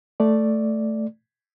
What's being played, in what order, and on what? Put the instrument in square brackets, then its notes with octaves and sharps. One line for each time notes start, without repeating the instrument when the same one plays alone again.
[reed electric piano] A3 D5